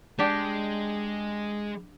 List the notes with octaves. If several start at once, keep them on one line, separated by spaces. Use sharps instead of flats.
G#3 D4 G4 G5